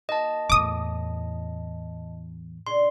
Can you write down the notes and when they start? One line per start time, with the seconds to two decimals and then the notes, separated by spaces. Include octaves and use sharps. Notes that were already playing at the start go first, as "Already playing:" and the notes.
0.09 A#3 D#4 F#4 D#5 A5
0.50 E2 A2 D6 D#6
2.67 A#2 C#3 D4 C6